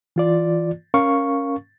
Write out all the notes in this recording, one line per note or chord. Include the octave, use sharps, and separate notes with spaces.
E3 F4 D5
C#4 A#4 F5 C#6